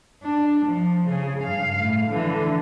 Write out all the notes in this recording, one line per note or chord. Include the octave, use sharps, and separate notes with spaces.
D4
F3
C#3 G#4
G2 F5
A2
D3 E3